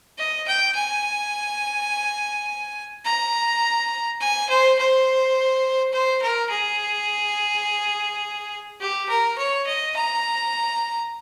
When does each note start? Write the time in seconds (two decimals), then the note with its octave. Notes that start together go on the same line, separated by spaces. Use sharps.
0.18 D#5
0.47 G5
0.75 G#5
3.05 A#5
4.21 G#5
4.49 C5
4.78 C5
5.92 C5
6.22 A#4
6.50 G#4
8.80 G4
9.09 A#4
9.38 C#5
9.66 D#5
9.96 A#5